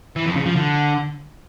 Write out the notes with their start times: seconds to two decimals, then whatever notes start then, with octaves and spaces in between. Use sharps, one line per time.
0.16 E3
0.26 F2
0.36 C#3
0.46 F3
0.56 D3